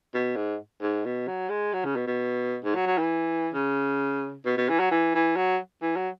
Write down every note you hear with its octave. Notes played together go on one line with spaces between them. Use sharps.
B2
G#2
G#2
B2
F#3
G#3
F#3
C#3
B2
B2
G#2
F#3
F#3
E3
C#3
B2
B2
E3
F#3
E3
E3
F#3
E3
F#3